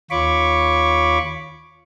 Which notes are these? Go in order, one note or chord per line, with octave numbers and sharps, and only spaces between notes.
D#2 F4 C#5 B5 C#6 D6